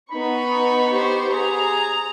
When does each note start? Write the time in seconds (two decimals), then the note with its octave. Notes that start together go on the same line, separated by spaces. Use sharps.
0.11 B3 D#4 B5 C#6
0.90 G4 C5
1.34 G#4 A#5